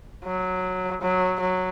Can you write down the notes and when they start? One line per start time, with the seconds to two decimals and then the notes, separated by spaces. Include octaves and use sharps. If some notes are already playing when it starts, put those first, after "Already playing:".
0.25 F#3
1.02 F#3
1.40 F#3